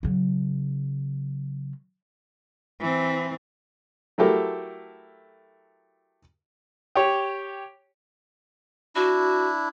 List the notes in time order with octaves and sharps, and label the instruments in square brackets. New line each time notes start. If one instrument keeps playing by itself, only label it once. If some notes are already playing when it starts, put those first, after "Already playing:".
[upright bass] C#3 F#3
[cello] E3 C4
[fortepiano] F#3 A3 E4 G4 A4 A#4
G4 C#5
[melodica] D4 E4 [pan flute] F#4